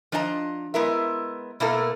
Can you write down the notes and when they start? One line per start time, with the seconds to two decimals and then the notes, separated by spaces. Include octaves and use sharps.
0.12 F3 D4 D#5 A5 A#5
0.74 G#3 B3 E4 A#4 E5
1.60 B2 A3 A#3 E4 A4 A#4